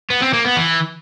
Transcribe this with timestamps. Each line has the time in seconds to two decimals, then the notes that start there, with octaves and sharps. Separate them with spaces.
0.10 B3
0.22 C4
0.33 A#3
0.45 B3
0.56 E3